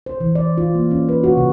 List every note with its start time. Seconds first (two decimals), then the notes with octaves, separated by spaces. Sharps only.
0.06 C5
0.20 E3
0.35 D5
0.58 F4
0.75 A#3
0.91 C#4
1.09 B4
1.24 F#4
1.37 C#3